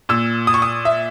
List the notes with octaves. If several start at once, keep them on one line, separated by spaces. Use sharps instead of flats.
A#2 E6
D#6
C#6
D#6
E5